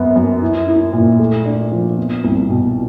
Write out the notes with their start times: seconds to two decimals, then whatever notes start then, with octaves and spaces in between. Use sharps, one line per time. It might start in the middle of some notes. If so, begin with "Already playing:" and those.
Already playing: F#2 B3
0.16 F#2
0.42 E4
0.67 E4
0.93 A#2
1.19 A3
1.45 D4
1.71 F3
1.98 B3
2.24 C2
2.49 B2